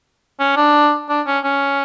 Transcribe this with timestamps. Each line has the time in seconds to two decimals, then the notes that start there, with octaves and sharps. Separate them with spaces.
0.40 C#4
0.56 D4
1.09 D4
1.26 C#4
1.44 C#4